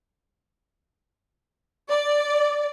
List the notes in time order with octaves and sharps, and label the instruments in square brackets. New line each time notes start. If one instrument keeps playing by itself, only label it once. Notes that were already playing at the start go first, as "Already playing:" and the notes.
[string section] D5